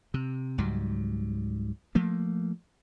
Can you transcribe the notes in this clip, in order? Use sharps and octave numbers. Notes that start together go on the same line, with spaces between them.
C3
C#2 G#2 F#3 G3
F3 A3 A#3